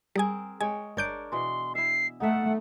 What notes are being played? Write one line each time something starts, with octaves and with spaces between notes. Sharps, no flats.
G3 C4 G#4 A#4 G#5
G#3 C#5 G5 G#5
G1 D4 A#4 C#5 G6 D7
B2 E3 C6
E4 E5 C7
A3 D#4 E5 F#5